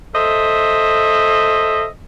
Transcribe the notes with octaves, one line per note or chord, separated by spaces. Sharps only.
A4 C5 D#5 E5